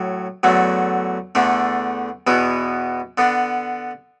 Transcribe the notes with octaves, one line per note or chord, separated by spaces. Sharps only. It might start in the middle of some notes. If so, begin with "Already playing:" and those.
Already playing: A2 F#3
E2 D3 F#3 A3
E2 D3 A3 D4
E2 B2 B3 E4
D3 B3 D4